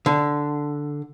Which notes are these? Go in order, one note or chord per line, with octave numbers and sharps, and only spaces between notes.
D3